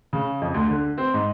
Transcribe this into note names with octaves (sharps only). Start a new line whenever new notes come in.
C#3
F2
D2
D3
C4
G#2